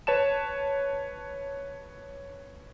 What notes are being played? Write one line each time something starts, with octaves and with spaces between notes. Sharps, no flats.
B4 C#5 A5 E7